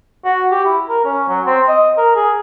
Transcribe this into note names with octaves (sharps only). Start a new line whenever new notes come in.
F#4
G4
E4
A#4
C#4
F#3
C4
D#5
A#4
G#4